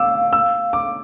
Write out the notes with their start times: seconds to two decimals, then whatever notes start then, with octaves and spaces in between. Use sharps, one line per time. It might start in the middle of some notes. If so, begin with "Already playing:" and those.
Already playing: F5 D6 E6
0.33 E6
0.73 D6